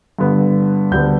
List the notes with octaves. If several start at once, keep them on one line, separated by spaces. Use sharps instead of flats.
G2 D3 B3
D2 D3 G3 B3 G6